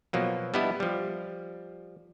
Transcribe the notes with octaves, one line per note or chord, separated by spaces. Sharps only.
B2 F3 F#3 A#3
G3 B3 D4 E4 G4 D#5
F3 G3